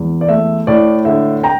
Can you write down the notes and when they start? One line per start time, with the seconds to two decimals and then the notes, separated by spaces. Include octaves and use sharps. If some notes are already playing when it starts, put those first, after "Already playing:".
Already playing: E2
0.21 D5
0.28 A3 E5
0.67 A2 D5
1.05 D3 E5
1.43 G5 A#5